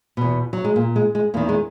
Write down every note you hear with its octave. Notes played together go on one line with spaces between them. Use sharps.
E2 B2
F#3
G#3
A#2 A#3
G#3
G#3
E2 D#3 A#3
G#3